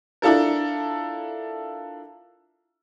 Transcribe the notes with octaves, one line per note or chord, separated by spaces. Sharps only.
D4 E4 F4 A4 A#4